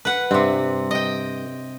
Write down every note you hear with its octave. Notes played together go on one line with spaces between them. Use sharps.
B4 F#5
G2 C3 C4
D#5 G5